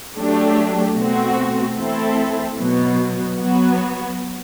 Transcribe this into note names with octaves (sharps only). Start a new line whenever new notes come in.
F#3 A3 D4 G4
B2 A3 C4 F#4
E3 A3 C4 E4 A4
B2 F#3 B3
F#3 B3 F#4